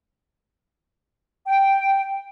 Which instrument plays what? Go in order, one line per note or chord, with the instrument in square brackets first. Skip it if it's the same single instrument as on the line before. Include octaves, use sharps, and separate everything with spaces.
[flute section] G5